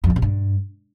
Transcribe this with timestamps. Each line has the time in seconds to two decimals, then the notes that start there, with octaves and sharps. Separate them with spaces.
0.04 F2
0.10 A2
0.16 C3
0.22 G2